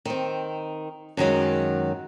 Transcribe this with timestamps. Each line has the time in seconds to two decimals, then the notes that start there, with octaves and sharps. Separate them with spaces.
0.05 D#3 C4
1.17 F#2 D#3 F#3 G#3